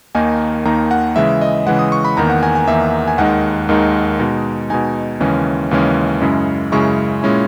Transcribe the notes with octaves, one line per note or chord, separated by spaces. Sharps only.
D#2 D#3 A#3 D#4 G#5
D#2 D#3 A#3 D#4 A#5
F#5
C#3 E3 G#3 E5
D#5
C#3 E3 G#3 F#5
D#6
C#6
B5
E2 D#3 A#3 A#5
F#5
G#5
G#5
E2 D#3 A#3 E5
G#5
D#2 D#3 G#3 D#4 F#5
D#2 D#3 G#3 D#4
B2 G#3 D#4
B2 G#3 D#4 G#5
D#2 C#3 E3 G#3 C#4
D#2 C#3 E3 G#3 C#4
F#2 C#3 G#3 C#4 E4
F#2 C#3 G#3 C#4 E4 C#6
A#2 G#3 C#4 E4